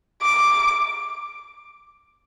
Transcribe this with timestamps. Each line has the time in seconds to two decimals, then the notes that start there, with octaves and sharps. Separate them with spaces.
0.22 D6